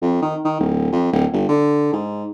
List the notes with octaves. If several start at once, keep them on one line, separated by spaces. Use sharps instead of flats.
F2
D#3
D#3
D1
F2
D1
G1
D3
G#2